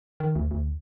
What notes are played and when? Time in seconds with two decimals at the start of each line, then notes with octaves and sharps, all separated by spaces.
0.20 D#3
0.36 D2
0.51 D2